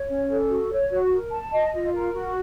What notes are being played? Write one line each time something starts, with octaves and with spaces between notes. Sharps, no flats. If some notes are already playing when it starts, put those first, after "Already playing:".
Already playing: C#5
C#4
A4
F#4
C#5
F#4
A#4
A5
D#5
F4
A#4
F#4